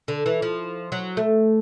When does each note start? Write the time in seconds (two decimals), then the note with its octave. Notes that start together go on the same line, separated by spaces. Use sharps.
0.08 D3
0.26 E3
0.42 F3
0.92 F#3
1.17 A3